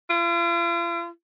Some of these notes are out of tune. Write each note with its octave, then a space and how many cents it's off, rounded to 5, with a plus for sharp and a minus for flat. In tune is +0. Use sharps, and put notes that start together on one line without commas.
F4 -40